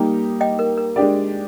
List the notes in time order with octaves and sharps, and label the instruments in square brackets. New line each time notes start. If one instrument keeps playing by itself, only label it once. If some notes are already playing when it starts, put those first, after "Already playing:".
Already playing: [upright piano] G3 A#3 D#4 G4
[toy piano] D#5 G5
A#4
A#4
[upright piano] G#3 D4 G4 D5 [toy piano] A#4